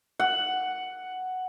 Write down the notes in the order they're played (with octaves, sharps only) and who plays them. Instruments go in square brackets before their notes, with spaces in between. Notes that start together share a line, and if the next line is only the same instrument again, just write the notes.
[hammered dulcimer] F#5